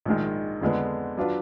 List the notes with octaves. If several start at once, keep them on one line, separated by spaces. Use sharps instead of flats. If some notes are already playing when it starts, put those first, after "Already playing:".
A#1 G#2 D#3 G#3
F2 D3 G#3 B3
F#3 D4 F4 B4